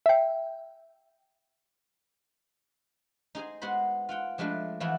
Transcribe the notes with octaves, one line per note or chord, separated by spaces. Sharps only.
E5 G5
D#4 G#4 C5 G#5
G#3 B3 F#4 C5 B5
F4 F#5 G5
F3 G#3 A3 D4 B4
E3 F3 G#3 A3 E4 F#4